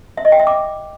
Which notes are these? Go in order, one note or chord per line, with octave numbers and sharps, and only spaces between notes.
E5
D#5
G5
E5
D6